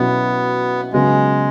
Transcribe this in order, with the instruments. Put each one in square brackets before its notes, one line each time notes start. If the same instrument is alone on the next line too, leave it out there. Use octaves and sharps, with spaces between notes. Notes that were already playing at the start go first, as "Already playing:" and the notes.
Already playing: [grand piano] B2 F#3 C#4 E4 [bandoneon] B3
[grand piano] C#3 F#3 B3 [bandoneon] G#3